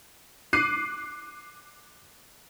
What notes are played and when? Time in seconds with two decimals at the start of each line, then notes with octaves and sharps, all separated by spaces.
0.53 D6 F#6 C7 D#7